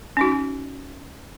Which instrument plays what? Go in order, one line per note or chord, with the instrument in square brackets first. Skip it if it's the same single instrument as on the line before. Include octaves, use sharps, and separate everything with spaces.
[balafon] C#4 D#4 F#4